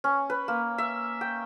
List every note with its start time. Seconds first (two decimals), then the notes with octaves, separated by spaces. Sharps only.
0.04 C#4
0.30 B4
0.48 A#3
0.78 E5
1.21 G5